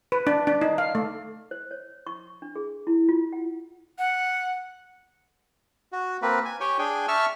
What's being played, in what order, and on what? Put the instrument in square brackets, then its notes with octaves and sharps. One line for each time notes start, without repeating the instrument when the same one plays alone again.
[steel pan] B4
D4
D4
D#4
F5
A3
[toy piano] C5
C#5
C#6
D4
G#4
E4
F4
F#5
[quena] F#5
[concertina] F#4
A#3 C4 B4
G#5
G4 C#5 G5 G#5
D4 G#4 G5 G#5
E5 A5 C#6 E6 F6